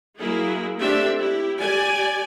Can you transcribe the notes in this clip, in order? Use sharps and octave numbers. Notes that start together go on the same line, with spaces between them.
F#3 A#3 E4 G#4
A3 C4 D4 G4 E5
E4 G4
G4 D5 G#5